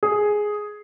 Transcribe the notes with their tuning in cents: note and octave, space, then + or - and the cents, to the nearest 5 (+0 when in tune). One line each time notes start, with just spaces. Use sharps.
G#4 +5